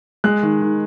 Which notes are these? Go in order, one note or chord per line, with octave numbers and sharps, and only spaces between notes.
G#3 F#6
D#3
D#3